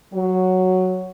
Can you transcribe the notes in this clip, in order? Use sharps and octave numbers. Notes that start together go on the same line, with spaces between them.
F#3